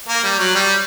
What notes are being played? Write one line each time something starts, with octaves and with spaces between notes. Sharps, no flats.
A#3
G3
F#3
G3